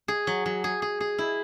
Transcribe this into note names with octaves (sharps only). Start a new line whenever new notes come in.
G#4
F#3
F#3
G#4
G#4
G#4
E4